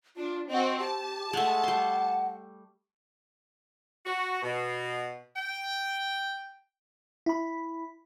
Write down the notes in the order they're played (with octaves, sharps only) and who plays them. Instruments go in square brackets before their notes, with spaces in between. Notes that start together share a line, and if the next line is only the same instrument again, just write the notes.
[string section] D4 [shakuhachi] F4
[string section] C4 F#4 [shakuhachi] D#5
[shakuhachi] G4 [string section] A5
[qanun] G#3 A3 [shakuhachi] F#5
[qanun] G3 C6
[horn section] F#4
B2
G5
[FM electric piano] E4 B5